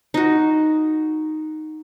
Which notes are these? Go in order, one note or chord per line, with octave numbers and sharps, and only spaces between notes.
D#4 F#4